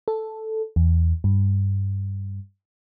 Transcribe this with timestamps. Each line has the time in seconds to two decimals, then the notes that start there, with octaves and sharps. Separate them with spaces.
0.08 A4
0.76 E2
1.24 G2